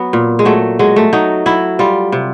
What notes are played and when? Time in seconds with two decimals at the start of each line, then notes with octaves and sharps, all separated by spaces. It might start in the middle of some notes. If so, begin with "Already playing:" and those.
Already playing: F#3 B3
0.13 A#2
0.39 G#3
0.45 F#3 A3
0.79 F#3 G#3
0.96 A3
1.13 F#3 D#4
1.46 F#3 E4
1.79 G3 F4
2.12 C3